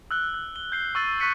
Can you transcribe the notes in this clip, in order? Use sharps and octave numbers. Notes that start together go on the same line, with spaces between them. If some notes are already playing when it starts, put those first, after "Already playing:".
E6 F#6 G7
F#6
G7
G6 C7 G7
C#6 E6 A6 D#7
C#6 F#6 A6 B6 C#7 D#7